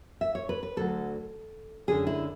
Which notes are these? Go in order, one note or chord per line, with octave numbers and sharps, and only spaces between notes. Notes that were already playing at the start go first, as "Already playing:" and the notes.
E5
C#5
B4
B4
D2 D3 F#3 A4
F#2 D3 G#3 G#4
E4